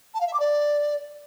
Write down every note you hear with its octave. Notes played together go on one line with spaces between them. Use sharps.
A5
F5
E5
D6
D5